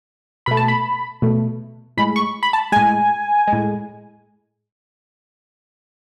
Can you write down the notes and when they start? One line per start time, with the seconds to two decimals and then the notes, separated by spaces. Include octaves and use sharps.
0.46 B2 A3 B5
0.57 A5
0.68 B5
1.22 B2 A3
1.97 A2 G#3 B5
2.16 C#6
2.43 B5
2.53 A5
2.72 A2 G#3 G#5
3.48 G#3
3.53 A2